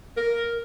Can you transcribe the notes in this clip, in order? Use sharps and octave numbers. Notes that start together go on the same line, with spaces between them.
A#4